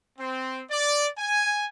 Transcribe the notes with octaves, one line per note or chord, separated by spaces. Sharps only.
C4
D5
G#5